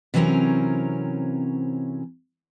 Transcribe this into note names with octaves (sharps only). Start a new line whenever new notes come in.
C3 E3 F#3 C4 C#4 A#4